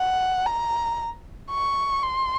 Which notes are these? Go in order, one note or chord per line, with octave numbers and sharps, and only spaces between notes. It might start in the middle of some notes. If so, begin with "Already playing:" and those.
Already playing: F#5
A#5
C#6
C6